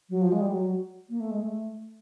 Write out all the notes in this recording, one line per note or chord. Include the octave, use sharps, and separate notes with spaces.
F#3
F3
G#3
G3
F#3
A#3
A3
G#3
A3